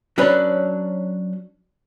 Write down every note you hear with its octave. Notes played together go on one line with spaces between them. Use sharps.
F#3 C#4 D4 B4